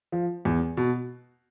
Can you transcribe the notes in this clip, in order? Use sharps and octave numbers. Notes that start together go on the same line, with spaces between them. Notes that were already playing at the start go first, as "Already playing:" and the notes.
F3
E2
B2